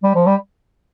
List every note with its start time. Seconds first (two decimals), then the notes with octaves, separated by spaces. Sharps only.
0.03 G3
0.15 F3
0.27 G3